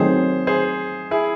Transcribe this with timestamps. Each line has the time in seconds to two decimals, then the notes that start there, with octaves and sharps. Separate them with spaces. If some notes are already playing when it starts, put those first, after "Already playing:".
Already playing: D#3 F#3 A3 C4 D#4 G#4 C5
0.47 G#4 C5
1.11 E4 G#4